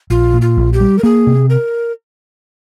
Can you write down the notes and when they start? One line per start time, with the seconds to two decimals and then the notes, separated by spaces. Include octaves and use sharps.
0.10 A#1 F4
0.33 A#2
0.41 F4
0.57 A#1
0.73 G4
0.81 G3
0.98 A#4
1.03 A#3 G#4
1.27 C3
1.50 A#4